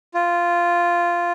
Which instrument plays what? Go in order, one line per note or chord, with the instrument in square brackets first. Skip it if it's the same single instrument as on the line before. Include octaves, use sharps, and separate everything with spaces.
[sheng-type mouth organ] F4